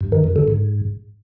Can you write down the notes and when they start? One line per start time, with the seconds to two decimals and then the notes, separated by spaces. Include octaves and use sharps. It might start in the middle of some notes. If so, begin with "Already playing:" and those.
0.01 G2
0.12 D#3
0.24 F#2
0.36 D3
0.48 G#2